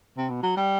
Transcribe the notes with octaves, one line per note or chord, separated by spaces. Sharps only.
C3
B2
F#3
G3